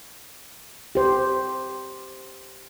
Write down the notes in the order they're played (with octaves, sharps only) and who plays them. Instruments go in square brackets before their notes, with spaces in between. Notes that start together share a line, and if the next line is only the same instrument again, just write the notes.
[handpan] G4 C5